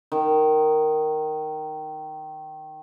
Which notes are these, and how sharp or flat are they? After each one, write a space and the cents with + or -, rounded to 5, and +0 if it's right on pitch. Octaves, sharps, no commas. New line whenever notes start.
D#3 -5